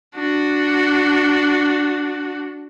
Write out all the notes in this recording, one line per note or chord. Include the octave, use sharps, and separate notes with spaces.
D4 F#4